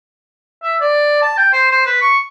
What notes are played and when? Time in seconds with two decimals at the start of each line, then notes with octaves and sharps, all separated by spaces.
0.63 E5
0.81 D5
1.22 A5
1.38 G5
1.53 C5
1.71 C5
1.86 B4
2.01 C#6